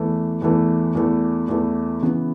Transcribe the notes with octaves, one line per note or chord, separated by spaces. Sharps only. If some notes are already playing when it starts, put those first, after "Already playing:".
Already playing: E2 E3 A3
E2 E3 A3
E2 E3 A3
E2 E3 A3
C#3 E3 B3